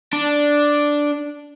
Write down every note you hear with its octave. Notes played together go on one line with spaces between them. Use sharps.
D4